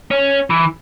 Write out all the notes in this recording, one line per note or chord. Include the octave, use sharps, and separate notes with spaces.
C#4
E3